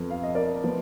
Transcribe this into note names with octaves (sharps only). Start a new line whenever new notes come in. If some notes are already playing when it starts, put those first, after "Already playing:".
Already playing: F2 F3 B3
F5
D#5
A#4 D5
F3 B3